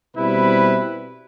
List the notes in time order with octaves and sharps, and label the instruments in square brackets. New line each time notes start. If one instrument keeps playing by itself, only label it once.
[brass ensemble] B2 G3 C4 E4 B4